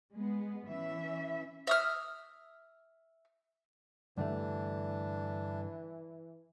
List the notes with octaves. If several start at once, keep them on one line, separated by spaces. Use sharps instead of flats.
G#3 B3
E3 C#4 E5
E5 D#6 F6
G2 D3 E3 A3 D4